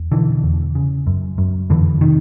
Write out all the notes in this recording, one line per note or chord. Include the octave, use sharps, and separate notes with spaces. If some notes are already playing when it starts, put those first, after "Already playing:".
Already playing: E2
B2 D3 E3
E2
C#3
F#2
F#2
F2 D3 E3
C3 D#3